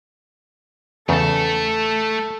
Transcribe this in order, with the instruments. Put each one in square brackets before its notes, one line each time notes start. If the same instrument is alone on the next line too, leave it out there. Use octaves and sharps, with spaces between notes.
[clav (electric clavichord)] E2 C#3 [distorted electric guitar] A3 A5 [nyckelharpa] A4